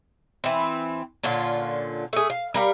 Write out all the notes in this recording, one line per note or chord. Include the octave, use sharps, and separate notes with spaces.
E3 C4
A#2 D3 C#4 F4
A3 G#4
F5
G3 A#4 F5